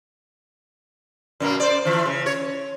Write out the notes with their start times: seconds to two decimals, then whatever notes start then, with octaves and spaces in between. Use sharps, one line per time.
1.40 F#2 B2 A#3
1.60 C5 D5
1.85 E3 F3
2.06 C#3
2.26 C#5